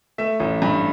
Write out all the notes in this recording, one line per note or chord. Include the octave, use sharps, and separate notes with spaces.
A3 E5
A1
G2